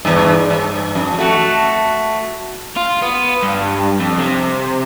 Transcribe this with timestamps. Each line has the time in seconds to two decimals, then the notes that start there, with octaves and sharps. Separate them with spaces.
0.05 E2 G2
0.50 G2
0.95 F2
1.18 A3 F#4
2.77 F4
3.02 B3
3.43 G2
4.00 F2
4.18 C3